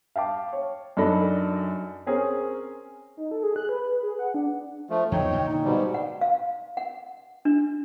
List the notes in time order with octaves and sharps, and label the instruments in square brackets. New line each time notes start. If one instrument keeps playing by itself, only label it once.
[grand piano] F5 G5 A5 D6
C#5
F#2 D4 D#4 A4 B5 A#6
C4 C#4 G#4 A#4
[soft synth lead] D#4
A4
G#4
F#6
B4
B4
G#4
F#5
D4
[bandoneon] F3 A3
[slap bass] E2 F3 F#3 [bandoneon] D#4 C#5 [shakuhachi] G5
[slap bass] A#2 D3
[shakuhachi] D#4
[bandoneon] G#2 B2 G3
[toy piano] F#5
F5
F#5
D4